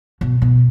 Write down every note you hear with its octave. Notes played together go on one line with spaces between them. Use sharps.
B2
B2